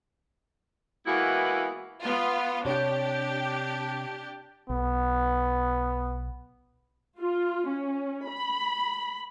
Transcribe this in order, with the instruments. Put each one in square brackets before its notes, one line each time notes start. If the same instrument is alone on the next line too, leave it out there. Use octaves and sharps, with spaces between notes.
[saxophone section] E3 G#3 A#3 B3 E4 F#4
[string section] B3 F4
[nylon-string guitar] C3 C#5 [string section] D4 G4
[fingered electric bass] B1 [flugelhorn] B3
[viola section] F4
C#4
B5